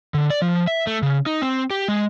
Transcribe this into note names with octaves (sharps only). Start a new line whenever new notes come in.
D3
D5
F3
E5
A3
C#3
D#4
C4
G4
G#3